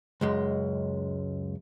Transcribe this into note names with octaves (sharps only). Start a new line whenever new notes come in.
C#2 F#2 G#3